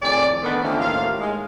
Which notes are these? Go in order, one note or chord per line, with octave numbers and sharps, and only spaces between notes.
F2 A2 D#3 G#4 D5
D3 D#3 B3
D3 D#3 F3 A3 A#3 C#4
D#2 A2 A#3 F4 F5
G#3